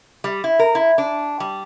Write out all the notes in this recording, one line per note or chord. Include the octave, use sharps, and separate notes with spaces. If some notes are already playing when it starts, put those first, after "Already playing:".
G3
E4
A#4
E4
D4
G3